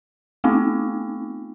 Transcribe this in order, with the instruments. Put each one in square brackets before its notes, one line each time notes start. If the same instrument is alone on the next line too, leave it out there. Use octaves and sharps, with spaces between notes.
[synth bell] A3 B3 C4 D#4 F4